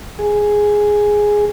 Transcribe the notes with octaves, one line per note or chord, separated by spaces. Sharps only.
G#4